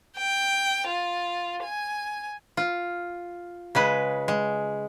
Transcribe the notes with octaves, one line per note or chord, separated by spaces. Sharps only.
G5
F4
G#5
F4
C#3 G#3 B4
G#3